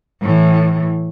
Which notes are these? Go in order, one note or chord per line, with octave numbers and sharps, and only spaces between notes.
A2 E3